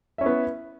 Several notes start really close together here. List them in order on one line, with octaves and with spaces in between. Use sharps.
E5 C#4 E4 B3